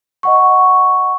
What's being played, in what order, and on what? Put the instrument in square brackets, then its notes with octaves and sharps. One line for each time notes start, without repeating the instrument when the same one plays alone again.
[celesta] D#5 F#5 C#6